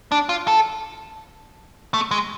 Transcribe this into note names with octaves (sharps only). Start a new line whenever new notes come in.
D4
F4
A4
A3
G#3